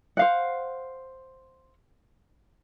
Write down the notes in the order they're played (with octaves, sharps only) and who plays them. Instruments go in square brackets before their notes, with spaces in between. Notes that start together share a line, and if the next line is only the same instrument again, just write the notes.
[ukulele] C5 F5 F#5